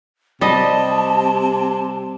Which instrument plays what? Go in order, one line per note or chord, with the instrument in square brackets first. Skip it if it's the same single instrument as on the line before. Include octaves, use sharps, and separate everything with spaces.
[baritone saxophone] C3 [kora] G3 D#5 [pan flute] A5